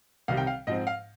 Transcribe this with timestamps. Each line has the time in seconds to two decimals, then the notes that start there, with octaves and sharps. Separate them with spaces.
0.28 C2 C3 D#3 G3 F5
0.37 G5
0.47 F5
0.67 G#2 F3 C4 D#5
0.87 F5